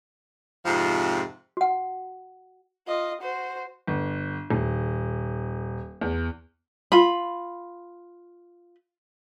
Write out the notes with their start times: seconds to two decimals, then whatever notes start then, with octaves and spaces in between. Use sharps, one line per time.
0.64 F2 G#2 C3 F3
1.57 F#4 F#5
2.87 F4 D#5
3.21 F#4 C5
3.87 G1
4.50 D#1
6.01 E2
6.92 F4 B5